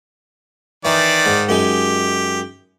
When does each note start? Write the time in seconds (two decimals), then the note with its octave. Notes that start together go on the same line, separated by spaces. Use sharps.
0.85 D#3 E3 D5
1.26 G#2
1.49 F#2 G#3 D#4 G4